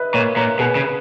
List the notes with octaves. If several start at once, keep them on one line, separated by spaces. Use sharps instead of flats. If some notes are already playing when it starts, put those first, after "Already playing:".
Already playing: B4 D#5 E5
A#2 A#4 C#5
A#2 A#4 C#5
B2 G#4 B4
C#3
B4